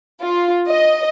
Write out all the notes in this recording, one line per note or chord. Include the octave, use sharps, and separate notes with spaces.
F4
D#5